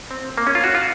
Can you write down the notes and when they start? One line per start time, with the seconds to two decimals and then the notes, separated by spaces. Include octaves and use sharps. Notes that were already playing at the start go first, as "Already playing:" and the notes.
0.11 C4
0.38 A#3
0.47 C#4
0.55 F4
0.64 F#4
0.75 F4